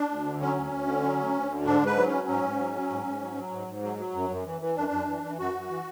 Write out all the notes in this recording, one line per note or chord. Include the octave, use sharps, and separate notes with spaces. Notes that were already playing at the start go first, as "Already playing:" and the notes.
Already playing: D4
D2
D3
F#3 C#4
D2
D2
D3
F#3
D2
D2
D3
G#2 D4
G#2
B4
F#3
C#4
F#3
G#2 C#4
G#2
F#3
F#3
G#2
G#2
F#3
F#3
G#2
G#2
F#3
F#3
F#2
F#2
E3
E3
F#2 D4
F#2
E3
E3
F#2 F#4
F#2
E3